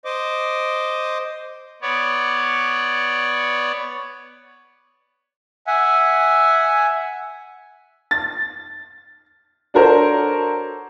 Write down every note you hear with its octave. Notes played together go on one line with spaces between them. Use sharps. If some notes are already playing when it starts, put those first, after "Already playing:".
C5 D#5 D6
B3 C#5 D5
E5 F#5 G#5
A6
D4 F#4 A4 A#4 C5 C#5